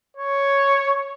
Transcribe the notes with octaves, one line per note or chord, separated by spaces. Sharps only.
C#5